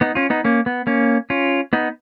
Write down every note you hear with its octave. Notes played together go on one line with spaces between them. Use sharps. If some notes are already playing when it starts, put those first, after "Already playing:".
B3 D#4
C#4 F4
B3 D#4
A#3 C#4
B3
A#3 C#4
C#4 F4
B3 D#4